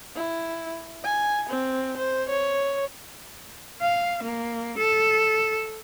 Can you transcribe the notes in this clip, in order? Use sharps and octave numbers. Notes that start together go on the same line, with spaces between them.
E4
G#5
C4
C5
C#5
F5
A#3
A4